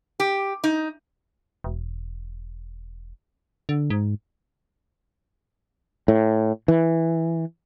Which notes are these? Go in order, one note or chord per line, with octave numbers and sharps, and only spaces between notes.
G4
D#4
E1
D3
G#2
A2
E3